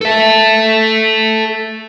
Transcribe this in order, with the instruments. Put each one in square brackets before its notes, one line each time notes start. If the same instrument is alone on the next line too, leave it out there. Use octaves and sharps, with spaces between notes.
[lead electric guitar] A4 E5